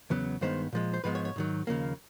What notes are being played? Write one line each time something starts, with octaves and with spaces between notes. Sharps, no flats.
E2 C#3 F#3 B3
G2 D#3 G#3 B3 C5
A#2 F3 G#3
C5
G#2 F3 G#3 B3 B4
C#5
C#5
G#2 D#3 F#3
D#2 C#3 F3 A#3